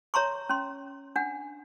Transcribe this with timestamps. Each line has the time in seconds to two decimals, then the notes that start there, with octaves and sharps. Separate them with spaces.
0.14 C#5 E5 A#5 C6 C#6
0.49 C#4 C6
1.16 D4 F#5